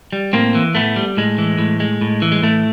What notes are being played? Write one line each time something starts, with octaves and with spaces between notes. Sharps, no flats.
G3
A2 A#3 C4
E3
A2 A3 B3
G3
A2 G#3
E3
A2
G#3
A2
E3
G#3
A2 A3